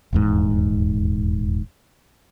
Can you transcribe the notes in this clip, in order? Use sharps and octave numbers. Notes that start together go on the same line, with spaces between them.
D#1 E2 G#2